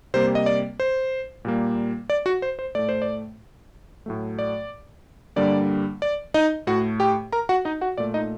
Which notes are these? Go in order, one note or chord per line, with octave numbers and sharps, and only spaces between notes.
C3 G3 A#3 C5
D#5
D5
C5
A#2 G3 A#3
D5
F#4 F#5
C5
C5
A2 A3 D5
C5
D5
A2 F#3 A3
D5
G2 D3 G3 A#3 D5
D5
D#4 D#5
A2 A3 F#4 F#5
G4 G5
A#4 A#5
F#4 F#5
D#4 D#5
F#4 F#5
A#2 A3 D5
D#4 D#5